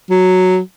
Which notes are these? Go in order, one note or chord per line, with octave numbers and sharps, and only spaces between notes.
F#3